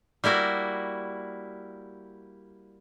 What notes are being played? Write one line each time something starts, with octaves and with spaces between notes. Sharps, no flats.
G3 A#3 E4 F#4